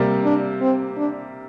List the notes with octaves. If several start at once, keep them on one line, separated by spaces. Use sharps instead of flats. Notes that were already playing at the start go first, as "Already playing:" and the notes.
Already playing: C3 G3 A#3
D4
C4
D4